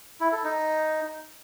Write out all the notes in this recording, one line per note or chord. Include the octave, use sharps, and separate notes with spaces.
E4
A4
D#4